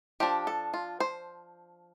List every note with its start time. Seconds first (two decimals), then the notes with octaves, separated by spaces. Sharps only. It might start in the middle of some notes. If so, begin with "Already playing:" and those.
0.20 F3 D4 G4
0.47 A4
0.74 F4
1.00 C5